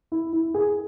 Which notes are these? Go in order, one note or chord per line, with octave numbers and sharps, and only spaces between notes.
E4
E4
G#4